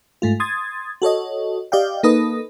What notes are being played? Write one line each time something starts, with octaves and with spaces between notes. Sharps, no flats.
G#2 A3 F4
C6 D#6 G#6 A6
F#4 A4 C#5 D#5
G4 D5 D#5 F5 G5
A#3 D#4 A4 B4 D#6